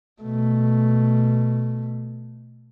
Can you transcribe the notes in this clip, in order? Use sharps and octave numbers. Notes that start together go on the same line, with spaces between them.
B2 A3